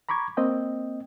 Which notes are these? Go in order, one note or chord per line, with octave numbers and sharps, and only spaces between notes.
A#5 B5 C#6 D6 G#6
A#3 C4 D#5 G5